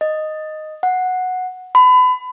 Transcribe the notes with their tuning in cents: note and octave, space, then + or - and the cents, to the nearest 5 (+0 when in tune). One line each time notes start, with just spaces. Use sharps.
D#5 -5
F#5 -5
B5 +30